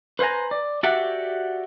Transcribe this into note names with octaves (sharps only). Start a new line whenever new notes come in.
B4 C5 F5 G#5 A#5
D5
F#4 G4 A4 D5 E5 F#5